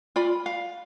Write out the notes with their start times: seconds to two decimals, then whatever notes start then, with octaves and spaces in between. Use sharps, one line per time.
0.16 F4 D5 B5
0.46 F5